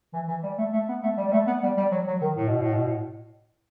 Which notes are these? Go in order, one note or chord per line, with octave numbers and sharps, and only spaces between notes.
E3
E3
G3
A3
A3
B3
A3
G3
G3
A3
B3
G3
G3
F#3
F#3
D#3
A2
B2
A2
B2
A2